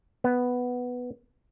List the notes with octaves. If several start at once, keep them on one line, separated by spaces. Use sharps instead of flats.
B3